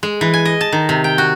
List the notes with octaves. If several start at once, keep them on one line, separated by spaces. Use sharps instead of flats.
G#3
E3
G#5
D#5
A5
D#3
C3
G5
F#4